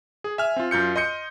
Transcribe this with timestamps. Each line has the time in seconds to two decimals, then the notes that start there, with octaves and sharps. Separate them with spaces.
0.24 G#4
0.38 E5 G#5 F6
0.56 C4 F4
0.71 F#2 F4 G6 C#7
0.96 D#5 C6 G6 C#7